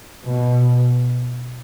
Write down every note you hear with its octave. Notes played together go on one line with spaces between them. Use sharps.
B2